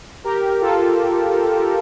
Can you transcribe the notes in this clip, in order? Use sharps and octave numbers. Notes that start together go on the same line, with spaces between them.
G4 A#4
F4 A4